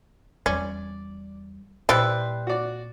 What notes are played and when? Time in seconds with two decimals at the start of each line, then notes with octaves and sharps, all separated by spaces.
0.46 E2 G3 C#4 D5
1.89 A#2 G3 E4 F4 B4 C5
2.47 F#4 D5